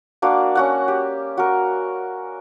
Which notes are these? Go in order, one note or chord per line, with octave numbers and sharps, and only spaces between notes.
A#3 D4 F#4 D5
C#4 F#4 F#5
G4
F#4 A#4